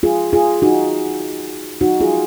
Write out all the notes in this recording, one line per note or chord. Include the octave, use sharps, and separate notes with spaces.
F4 G#4
F4 G#4
D#4 F#4
D#4 F#4
F4 G#4